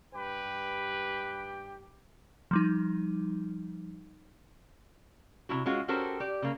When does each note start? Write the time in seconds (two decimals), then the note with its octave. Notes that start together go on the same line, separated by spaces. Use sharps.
0.14 G2 G4 B4 G5
2.51 F3 G3 D#4
5.49 C3 C#4 E4 F#4
5.66 G#3 C#4 F4 F#4
5.88 C#4 F#4 G4 A4 A#4 C5
6.20 G4 D5
6.42 C#3 A#3